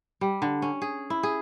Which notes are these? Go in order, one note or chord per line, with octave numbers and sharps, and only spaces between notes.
G3
D3
C#4
G#4
E4
G#4